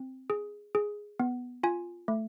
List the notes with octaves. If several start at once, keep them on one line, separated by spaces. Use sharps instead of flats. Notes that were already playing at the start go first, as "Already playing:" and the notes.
Already playing: C4
G#4
G#4
B3
F4 G#5
A3